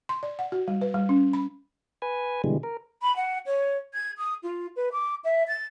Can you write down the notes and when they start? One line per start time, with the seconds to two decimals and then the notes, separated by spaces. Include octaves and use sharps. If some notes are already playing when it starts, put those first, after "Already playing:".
0.09 C6
0.23 D5
0.39 F#5
0.52 F#4
0.68 G3
0.81 B4
0.94 G3
1.09 C#4
1.33 B5
2.02 B4 G#5
2.44 B2 D3 E3 G3 G#3
2.63 A#4
3.02 B5
3.15 F#5
3.46 C#5
3.93 G#6
4.17 D#6
4.43 F4
4.76 B4
4.92 D6
5.24 E5
5.47 A6